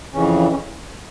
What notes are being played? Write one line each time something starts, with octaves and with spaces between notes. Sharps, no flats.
F2 C#3 E3 C#4
C#4